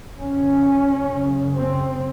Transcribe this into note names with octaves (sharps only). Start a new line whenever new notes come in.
F2 C#3 C#4
F#2 C#3
C4